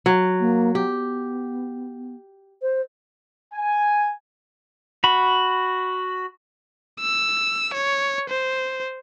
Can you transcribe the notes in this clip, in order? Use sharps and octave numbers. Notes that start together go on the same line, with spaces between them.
F#3
A#3
B3 G4
C5
G#5
F#4 B5
E6
C#5
C5